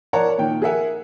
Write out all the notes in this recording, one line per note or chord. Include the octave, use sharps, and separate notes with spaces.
A#4 C#5 D5 F#5 A5 A#5
A#2 D#3 G5
G#4 A#4 E5 F#5 G#5